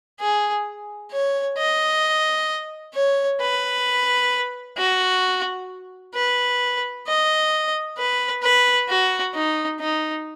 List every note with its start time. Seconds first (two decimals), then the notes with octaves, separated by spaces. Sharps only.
0.20 G#4
1.12 C#5
1.58 D#5
2.94 C#5
3.41 B4
4.78 F#4
6.15 B4
7.07 D#5
7.98 B4
8.43 B4
8.89 F#4
9.34 D#4
9.80 D#4